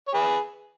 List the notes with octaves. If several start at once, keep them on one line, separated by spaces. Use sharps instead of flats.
C#5
G#4 B4